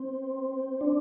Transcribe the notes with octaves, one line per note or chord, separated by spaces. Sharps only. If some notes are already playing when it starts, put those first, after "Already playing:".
Already playing: C4
D4